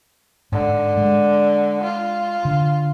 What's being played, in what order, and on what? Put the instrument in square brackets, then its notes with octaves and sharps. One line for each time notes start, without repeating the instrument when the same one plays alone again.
[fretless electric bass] G#2 [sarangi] D3
[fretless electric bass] G#3
[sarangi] F4
[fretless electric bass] D3